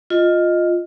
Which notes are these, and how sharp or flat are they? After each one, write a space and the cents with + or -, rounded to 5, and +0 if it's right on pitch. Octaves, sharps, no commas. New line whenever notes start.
F4 +10 D#5 +0